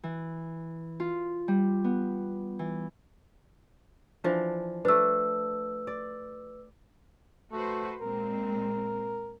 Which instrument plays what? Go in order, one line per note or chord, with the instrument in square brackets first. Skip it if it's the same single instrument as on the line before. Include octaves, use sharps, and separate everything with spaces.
[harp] E3
F4
G3
B3
E3
[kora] E3 F3 D4
[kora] A3 D4 [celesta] B4 E6
[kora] D5
[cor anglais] A3 [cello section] F#4 B4 C5
[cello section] A#2 G#3 C4 [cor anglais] A#4